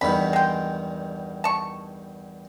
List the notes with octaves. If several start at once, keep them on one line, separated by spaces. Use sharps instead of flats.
E2 G2 D#3 B5
G#3 G5
A5 C#6